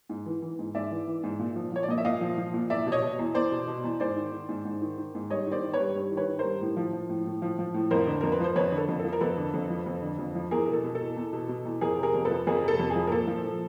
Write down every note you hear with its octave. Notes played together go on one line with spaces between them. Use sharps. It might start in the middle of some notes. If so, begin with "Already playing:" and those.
G#2
E3
E3
G#2
G#2 D5 E5
E3
E3
G#2
A#2
F3
F3 C#5
D5
A#2 D#5
E5
A#2 D#5 F5
F3
F3
A#2
E2 D5 E5
B2
C#5 D#5
B2
E2
E2 C5 D5
B2
B2
E2
G#2 C5 D5
D#3
D#3
G#2
G#2
D#3
D#3
G#2
G2 C#5 D#5
D#3
C5 D5
D#3
B4 C#5
G2
G2
D#3
B4 C#5
D#3
A#4 C5
G2
A2
F3
F3
A2
A2
F3
F3
A2
F2 A#4 C5
D3
F2 A#4
B4
F3 C5
F2 B4 C#5
D3
A4
F2
A4
F3
A#4
F2 A4 B4
D3
F2
F3
F2
D3
F2
F3
E2 G#4 A#4
B2 A#4
A4
B2
A4
E2
E2
B2
B2
E2
F2 G#4 A#4
C3
G#4 A#4
F2
A4 B4
F3
F2 G#4 A#4
C3
A4
F2
G#4
F3
A#4
A#2 A4
F3
F3